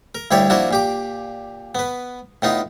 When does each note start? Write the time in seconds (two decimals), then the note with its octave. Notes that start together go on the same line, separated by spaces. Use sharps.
0.15 A#4
0.31 D2 G2 E4 G4 C#5 D5
0.50 F3 A#3 D4 E4 F#4
0.71 A#2 G4 D6
1.75 B3 B4
2.42 A2 B3 D#4 F4